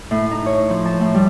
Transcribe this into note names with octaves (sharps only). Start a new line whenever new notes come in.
A2
D#4
C#5
F3
A5
A2
G3